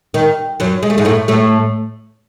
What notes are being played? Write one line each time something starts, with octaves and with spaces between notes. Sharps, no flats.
D#3
F#2 F#3
G#3
A3
G#2 G#3
A2 A3
A2 A3